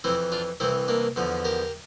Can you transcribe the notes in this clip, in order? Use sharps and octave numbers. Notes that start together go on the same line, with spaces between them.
F2 E3 C4 E4
D4 F4
C2 C3 E3 C4 E4
A#3 D4
E2 D3 F3
G4 A#4